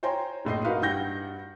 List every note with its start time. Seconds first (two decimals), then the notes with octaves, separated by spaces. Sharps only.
0.03 C5 C#5 G5 G#5 A#5 C6
0.45 F#1 A2 D#5 C7
0.65 D#4 F#4 A#4 B4 F5
0.81 G2 F#5 G5 G6 A#6